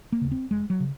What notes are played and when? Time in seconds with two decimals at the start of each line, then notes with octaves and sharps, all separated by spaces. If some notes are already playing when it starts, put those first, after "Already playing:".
0.12 A#3
0.21 D#2 C#3
0.32 C4
0.51 F1 G#3
0.70 F#3
0.80 C#3